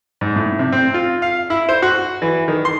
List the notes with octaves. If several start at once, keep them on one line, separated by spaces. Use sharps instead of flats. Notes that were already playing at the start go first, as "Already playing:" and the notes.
G#2
A2
C3
C4
F4
F5
E4
C5
F#4
E3
D#3
C6